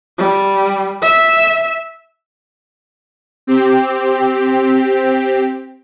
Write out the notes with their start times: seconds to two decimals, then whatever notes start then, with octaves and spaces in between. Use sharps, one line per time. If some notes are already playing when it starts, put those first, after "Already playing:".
0.18 G3
1.02 E5
3.47 C4 G4